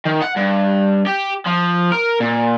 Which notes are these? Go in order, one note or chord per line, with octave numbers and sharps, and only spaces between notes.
D#3
F#5
G2
G4
F3
A#4
A#2